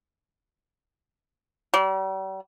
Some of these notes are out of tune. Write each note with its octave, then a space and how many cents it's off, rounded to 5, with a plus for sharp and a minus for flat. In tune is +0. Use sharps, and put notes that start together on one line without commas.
G3 -40